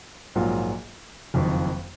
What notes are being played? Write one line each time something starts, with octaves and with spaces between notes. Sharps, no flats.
A#1 G#2 F#3 A#3 F4
F#1 F2 D#3